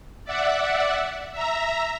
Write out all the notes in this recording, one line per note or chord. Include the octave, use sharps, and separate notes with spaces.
D5 E5 F#5
E5 A#5